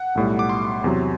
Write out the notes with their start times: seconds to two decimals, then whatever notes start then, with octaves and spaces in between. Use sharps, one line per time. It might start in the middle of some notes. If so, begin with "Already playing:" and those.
Already playing: F#5
0.15 B1 A2 G3
0.39 D6
0.49 C6
0.84 E2 C3 F#3